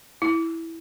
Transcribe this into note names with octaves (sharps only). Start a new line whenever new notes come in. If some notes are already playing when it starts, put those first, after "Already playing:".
E4